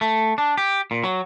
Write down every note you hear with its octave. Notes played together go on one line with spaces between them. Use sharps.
A3
D4
G4
A#2
F#3